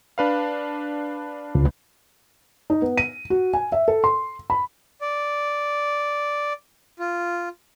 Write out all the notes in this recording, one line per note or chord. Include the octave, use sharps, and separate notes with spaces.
D4 B4 F5
C#2
D#4
B3
D#7
F#4
G#5
E5
A4
C6
B5
D5
F4